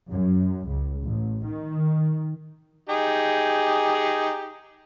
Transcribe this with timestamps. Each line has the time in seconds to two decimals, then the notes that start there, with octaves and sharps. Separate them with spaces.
0.10 F#2
0.69 C#2
1.02 A1
1.45 D#3
2.89 D#4 G4 G#4